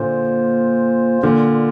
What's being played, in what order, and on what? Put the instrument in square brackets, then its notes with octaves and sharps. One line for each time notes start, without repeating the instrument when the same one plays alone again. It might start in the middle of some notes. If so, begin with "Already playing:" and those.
Already playing: [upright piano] A#2 D3 [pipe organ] A#3 F4 C5
[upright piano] A#2 D3 [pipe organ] A#3 F4 A#4